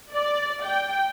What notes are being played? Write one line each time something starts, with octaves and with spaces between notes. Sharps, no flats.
D5
G5